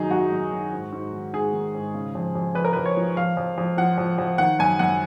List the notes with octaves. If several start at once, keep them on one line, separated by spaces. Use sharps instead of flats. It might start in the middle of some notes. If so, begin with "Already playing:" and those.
Already playing: F#2 D#3 F#3 D#4 G#4
F#2 F#4
F#2
D#3
G#2
G#2
D#3
G#2 G#4
D#3
G#2
C#3
F2
F2
F2 B4
A#4
F2 B4
C#5
F3
F2 F5
F2
F2
F3 F#5
F2
F2
D#3 F#5
F#2 G#5
F#2 F#5